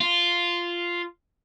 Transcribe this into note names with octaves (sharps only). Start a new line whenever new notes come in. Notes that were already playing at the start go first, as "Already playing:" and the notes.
F4